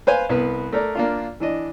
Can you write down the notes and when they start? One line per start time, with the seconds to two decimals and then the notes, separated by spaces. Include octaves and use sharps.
0.07 B4 C5 F5 G#5
0.29 C2 B3 B4
0.73 A3 A#4 D5
0.95 A#3 D4 F4
1.40 E3 D4 D#5